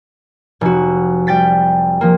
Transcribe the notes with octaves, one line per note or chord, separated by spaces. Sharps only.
F1 F#4
G3 G5 A6 B6
F3 A#3